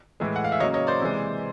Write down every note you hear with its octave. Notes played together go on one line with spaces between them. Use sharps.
A2 E3 G#3
F#5
F5
E5
C#3 F#3 A#3 C#5 D#5
C#5 D#5
C5 D5
C3 E3 G#3